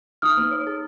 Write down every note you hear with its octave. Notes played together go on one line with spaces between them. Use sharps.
D#4 D#6 F6
A#3
C#5
G#4